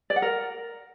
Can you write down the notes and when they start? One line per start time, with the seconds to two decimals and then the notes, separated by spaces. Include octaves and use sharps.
0.10 D5
0.16 F#5
0.22 A#4